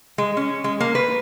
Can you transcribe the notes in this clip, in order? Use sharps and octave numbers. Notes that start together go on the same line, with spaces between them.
G#3
C#4
G#3
A#3
B4